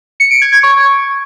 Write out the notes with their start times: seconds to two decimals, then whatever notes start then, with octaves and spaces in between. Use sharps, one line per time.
0.20 C#7
0.31 D7
0.42 G#6
0.52 G#6
0.63 C#6